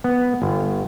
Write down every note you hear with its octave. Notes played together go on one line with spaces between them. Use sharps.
B3
G1